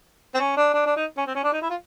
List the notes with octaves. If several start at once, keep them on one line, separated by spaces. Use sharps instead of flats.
C4
C#4
D4
D4
D4
D#4
C#4
C4
C#4
D4
D#4
E4
F4